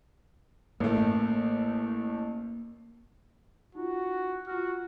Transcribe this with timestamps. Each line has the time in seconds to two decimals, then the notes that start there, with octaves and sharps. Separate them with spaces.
0.80 A1 A3 A#3
3.75 D#4 F4 F#4
4.47 F4 F#4 F6